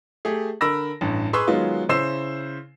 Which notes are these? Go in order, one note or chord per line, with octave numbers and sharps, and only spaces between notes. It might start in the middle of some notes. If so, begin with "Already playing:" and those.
A3 G4 G#4
D3 A#4 B5 E6 A#6
A1 G2
G#4 B4 C6 C#6 E6
D#3 F#3 G#3 B3 F4
C#3 E4 C5 E6 C7 E7